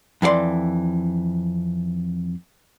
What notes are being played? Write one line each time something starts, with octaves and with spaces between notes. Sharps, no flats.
F2 E3 F#4 D5 C6